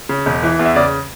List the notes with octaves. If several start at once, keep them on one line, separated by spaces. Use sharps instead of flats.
C#3
E1
E3
E2
E5
C#3 D5